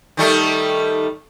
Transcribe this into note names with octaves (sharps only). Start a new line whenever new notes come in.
D#3 G3 A3